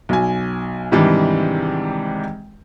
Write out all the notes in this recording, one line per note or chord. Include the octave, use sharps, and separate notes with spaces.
B1 G#5
G#2 C3 D#3 E3 G3 D4